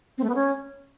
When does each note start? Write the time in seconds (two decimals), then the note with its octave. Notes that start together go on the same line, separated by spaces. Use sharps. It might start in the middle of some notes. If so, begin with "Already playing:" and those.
0.18 C4
0.24 A3
0.29 B3
0.35 C#4